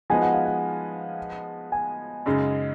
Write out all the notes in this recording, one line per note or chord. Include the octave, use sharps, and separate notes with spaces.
F3 G#3 B3 D#4 F#4 G#5
F#5
F5
F#5
G#5
F#2 C#3 G#3 D#4